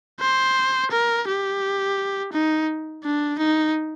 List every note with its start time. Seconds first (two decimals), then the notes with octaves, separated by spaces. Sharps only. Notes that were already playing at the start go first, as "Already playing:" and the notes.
0.20 C5
0.91 A#4
1.27 G4
2.33 D#4
3.04 D4
3.39 D#4